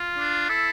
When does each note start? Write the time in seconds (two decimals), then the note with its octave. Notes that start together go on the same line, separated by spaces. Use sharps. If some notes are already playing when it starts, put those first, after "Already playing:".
Already playing: F4
0.18 D4
0.49 E4 A4